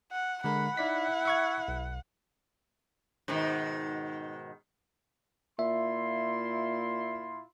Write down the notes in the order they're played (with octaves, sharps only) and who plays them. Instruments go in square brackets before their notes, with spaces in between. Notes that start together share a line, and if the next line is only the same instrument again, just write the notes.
[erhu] F#5
[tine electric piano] D3 G#3 A#4 [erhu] F#5 [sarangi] B5
[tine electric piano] D#4 D5 B6 [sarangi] E4
[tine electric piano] E5 C#6 G#6
B1
[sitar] G#2 B2 D#3
[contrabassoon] A#2 [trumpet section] E4 F4 C6 [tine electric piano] E5